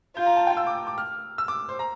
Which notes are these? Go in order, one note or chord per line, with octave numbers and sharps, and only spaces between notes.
F4 G6
A#5
A5
G5
E6
D6
D6
F6
E6
D6
C5
A#5